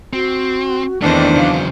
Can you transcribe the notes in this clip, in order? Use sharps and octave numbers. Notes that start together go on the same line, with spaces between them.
C4 F#4
E2 D#3 A3 C4 D4 D#4 C5
C#3 F#3 F5